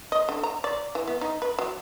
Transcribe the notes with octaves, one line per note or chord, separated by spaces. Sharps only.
D#5
D3
A#5
D5
E3
B3
D#4
B4
F#3